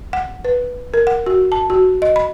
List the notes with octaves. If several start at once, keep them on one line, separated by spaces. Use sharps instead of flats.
F#5
B4
A#4
F#5
F#4
A5
F#4
D#5
B5